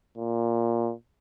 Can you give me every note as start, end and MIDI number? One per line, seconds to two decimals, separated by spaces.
0.18 0.92 46